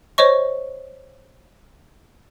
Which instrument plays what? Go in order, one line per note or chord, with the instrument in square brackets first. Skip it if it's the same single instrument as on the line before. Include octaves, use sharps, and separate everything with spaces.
[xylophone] C5 C#5 D#5 C#6